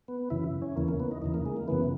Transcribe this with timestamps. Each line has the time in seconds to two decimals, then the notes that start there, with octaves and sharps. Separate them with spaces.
0.08 B3
0.30 F#2 C#3 E3 E4
0.62 C#4
0.76 E2 C#3 E3 A#3
0.88 A#3
1.00 B3
1.11 D#4
1.22 E2 C#3 E3 D#4
1.34 A#3
1.46 G#3
1.57 A#3
1.68 F#2 C#3 E3 B3